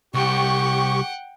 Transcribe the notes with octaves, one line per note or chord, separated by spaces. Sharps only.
C2 G4 F#5 G5 C#6